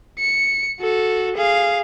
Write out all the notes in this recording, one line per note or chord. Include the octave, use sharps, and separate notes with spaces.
C#7
F#4 A4
G#4 F5